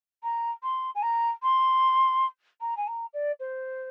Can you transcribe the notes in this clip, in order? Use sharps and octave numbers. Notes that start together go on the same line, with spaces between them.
A#5
C6
G#5
A#5
C6
A#5
G#5
A#5
D5
C5